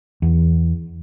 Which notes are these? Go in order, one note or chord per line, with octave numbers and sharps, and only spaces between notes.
E2